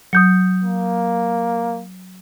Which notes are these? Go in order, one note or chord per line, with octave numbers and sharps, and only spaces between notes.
F#3 D#6 G6 C#7
A#3